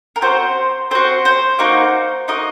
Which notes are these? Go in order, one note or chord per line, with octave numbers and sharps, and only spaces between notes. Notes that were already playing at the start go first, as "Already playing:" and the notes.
A#4
C4 F#4 C5
C4 F#4 C5
C5
A#3 D#4 F#4
A#3 D#4 F#4 D#5